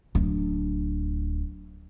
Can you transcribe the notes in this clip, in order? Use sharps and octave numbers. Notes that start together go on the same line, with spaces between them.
D1 D4